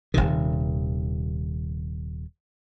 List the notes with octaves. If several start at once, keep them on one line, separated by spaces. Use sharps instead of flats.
D#1 A#1 C3 D#3